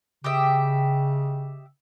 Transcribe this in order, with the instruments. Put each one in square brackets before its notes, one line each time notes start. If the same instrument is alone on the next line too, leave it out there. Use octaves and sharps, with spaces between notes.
[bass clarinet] C#3 [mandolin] G4 D#5 E5